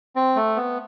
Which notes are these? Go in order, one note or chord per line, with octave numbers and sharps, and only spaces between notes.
C4
A3
B3